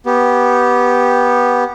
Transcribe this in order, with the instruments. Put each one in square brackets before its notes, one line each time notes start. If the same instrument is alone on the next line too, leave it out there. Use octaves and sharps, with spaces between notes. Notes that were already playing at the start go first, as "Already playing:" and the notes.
[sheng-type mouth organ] B3 G4